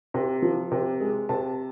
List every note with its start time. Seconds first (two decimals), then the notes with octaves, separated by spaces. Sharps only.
0.14 C3
0.42 F3
0.72 C3
1.00 G#3
1.29 C3 A5